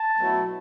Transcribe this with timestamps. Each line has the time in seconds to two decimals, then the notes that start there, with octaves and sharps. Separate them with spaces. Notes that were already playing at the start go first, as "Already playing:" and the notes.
Already playing: A5
0.18 B2 F#3 A3 E4